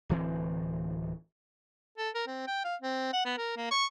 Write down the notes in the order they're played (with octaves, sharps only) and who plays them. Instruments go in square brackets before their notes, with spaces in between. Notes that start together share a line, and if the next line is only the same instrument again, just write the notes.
[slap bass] D1 E3 C4
[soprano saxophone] A4
A#4
C4
G5
F5
C4
F#5
B3
A#4
A#3
C#6